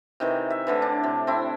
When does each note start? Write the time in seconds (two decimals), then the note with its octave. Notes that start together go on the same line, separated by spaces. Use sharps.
0.20 C3 D#3 E3
0.50 E5
0.67 A2 D3 E3
0.82 D4
1.04 C3
1.27 C4 E4